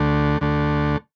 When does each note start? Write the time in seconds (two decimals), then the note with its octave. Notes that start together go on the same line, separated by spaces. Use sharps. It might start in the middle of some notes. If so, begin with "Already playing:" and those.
Already playing: D2 D3 A3
0.41 D2 D3 A3